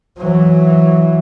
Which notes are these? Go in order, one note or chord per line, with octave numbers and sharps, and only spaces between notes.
E3 F#3